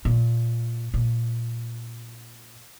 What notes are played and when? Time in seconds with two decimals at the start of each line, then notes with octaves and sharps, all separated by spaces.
0.05 A#2
0.94 A#2